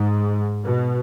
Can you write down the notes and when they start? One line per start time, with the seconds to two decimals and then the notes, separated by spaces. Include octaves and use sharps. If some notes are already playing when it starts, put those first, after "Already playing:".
Already playing: G#2
0.66 B2